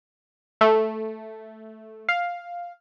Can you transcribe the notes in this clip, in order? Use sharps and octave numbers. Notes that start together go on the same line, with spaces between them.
A3
F5